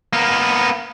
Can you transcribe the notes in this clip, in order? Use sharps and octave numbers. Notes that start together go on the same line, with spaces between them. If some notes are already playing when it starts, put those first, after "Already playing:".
A#3 B3